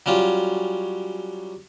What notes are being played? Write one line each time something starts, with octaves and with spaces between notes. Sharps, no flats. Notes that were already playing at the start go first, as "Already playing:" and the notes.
F#3 G3 C#4 F4